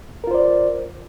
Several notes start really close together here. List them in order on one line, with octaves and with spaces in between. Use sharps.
A#4 F4 C5 D5